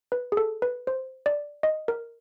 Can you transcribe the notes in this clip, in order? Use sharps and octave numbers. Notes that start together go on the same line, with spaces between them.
B4
G#4
A4
B4
C5
D5
D#5
A#4